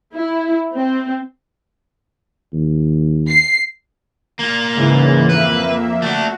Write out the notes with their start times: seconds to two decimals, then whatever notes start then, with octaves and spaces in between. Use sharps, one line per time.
0.14 E4
0.75 C4
2.53 D#2
3.28 C7
4.39 A#3 F4
4.75 G#2 C#3 E3
5.30 F2 A#3 B4 E5
6.02 A3 D4 F#4